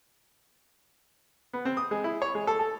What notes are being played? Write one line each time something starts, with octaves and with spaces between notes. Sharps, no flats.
B3
C4
D#6
G#3
E4
C#5
G#3
A4
A4